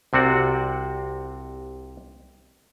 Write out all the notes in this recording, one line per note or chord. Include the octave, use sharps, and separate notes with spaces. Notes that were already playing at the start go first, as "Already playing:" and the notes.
C2 C3 C4 F#4 D5